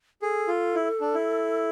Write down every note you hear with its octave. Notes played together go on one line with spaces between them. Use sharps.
G#4 A4
F4
E4
D4
E4